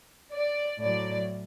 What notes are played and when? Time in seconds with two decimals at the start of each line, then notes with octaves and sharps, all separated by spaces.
0.34 D5
0.81 A2 F#3 D5